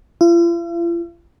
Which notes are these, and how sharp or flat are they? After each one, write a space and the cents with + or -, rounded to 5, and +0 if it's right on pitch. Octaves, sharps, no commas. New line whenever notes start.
F4 -45